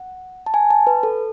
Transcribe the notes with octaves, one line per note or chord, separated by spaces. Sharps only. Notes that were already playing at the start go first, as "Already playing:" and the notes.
Already playing: F#5
A5
G#5
A5
B4
A4